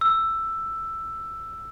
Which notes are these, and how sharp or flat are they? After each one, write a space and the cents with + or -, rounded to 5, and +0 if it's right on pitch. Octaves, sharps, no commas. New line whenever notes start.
E6 +10